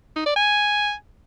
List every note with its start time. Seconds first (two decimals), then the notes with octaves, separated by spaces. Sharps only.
0.16 D#4
0.26 D5
0.36 G#5